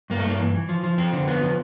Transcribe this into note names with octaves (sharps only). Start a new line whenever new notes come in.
G2 A#3
A3
G2 A#3
E3
E3
F3
F3
F2 C4
D3
F3 B3
F3